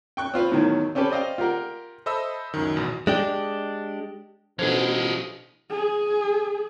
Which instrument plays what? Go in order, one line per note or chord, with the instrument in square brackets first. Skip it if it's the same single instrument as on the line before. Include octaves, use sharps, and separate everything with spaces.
[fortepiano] G5 C#6 F#6
C4 F4 B4
E2 A2 D#3 F#3
C4 C#4 G4 A4 B4
C5 D5 D#5 F5 G5
F4 G4 A#4 F#5
[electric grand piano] A4 C5 D#5 E5 B5 E6
C#2 F#2 D#3
A1 E2 B2 E3
[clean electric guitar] G#3 D4 G4
[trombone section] A1 B2 [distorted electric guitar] F3 G#4 [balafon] D4 A4 C5
[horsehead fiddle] G#4